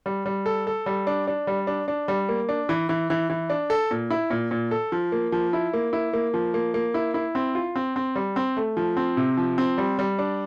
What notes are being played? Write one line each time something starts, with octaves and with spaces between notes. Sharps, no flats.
G3
G3
A4
A4
G3
D4
D4
G3
D4
D4
G3
A#3
D4
E3
E3
E3
E3
D4
A4
A#2
E4
A#2
A#2
A4
F3
A#3
F3
E4
A#3
E4
A#3
F3
A#3
A#3
E4
E4
C4
F4
C4
C4
G3
C4
A3
F3
C4
C3
F3
C4
G3
G3
D4